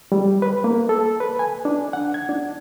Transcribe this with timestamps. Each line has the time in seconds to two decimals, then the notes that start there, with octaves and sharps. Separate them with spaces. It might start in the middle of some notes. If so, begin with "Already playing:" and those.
0.12 G3
0.42 B4
0.64 A#3
0.89 A4
1.20 B4
1.39 G#5
1.65 D4
1.93 F#5
2.14 G#6
2.29 D4